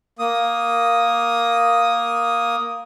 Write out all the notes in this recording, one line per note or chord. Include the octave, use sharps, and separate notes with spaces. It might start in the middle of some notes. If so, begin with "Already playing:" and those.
A#3 D#6